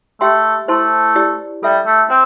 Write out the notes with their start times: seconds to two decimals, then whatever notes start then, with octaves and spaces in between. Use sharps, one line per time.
0.21 A3 G4 E5 G5 C6
0.68 A3 E4 C5 A5 C6
1.16 E4 G4 D5
1.63 G3 A4 E5 G5
1.86 A3
2.10 C4 C5 G5